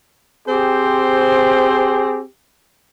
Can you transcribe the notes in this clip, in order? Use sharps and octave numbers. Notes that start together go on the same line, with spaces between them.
C4 G4 G#4 C5